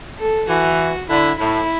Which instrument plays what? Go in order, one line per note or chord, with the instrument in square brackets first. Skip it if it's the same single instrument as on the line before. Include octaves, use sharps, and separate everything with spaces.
[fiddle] A4
[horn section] E3 [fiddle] F#4
[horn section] D3 [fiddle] E4
[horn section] A2 [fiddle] E4